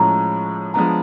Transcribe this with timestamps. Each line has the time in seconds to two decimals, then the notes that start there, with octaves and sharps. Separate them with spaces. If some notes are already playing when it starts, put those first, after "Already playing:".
Already playing: A2 F3 G#3 C#4 A#5
0.74 F3 G#3 B3 D4 A#5